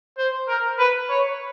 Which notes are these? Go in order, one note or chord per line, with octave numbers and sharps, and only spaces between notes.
C5
A#4
B4
C#5